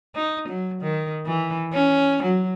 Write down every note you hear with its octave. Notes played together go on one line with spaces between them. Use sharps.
D#4
F#3
D#3
E3
C#4
F#3